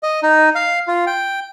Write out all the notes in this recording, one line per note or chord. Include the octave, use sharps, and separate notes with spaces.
D#5
D#4
F5
F4
G5